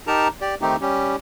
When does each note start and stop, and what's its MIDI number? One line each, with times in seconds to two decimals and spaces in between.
0.07 0.28 63
0.07 0.28 67
0.07 0.28 70
0.07 0.28 81
0.07 0.28 82
0.41 0.55 67
0.41 0.55 74
0.62 0.76 51
0.62 0.76 57
0.62 0.76 60
0.62 0.76 63
0.62 0.76 67
0.81 1.16 55
0.81 1.16 61
0.81 1.16 67